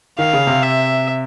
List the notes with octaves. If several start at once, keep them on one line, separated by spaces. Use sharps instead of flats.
D#3 F5
C#3
C3
E5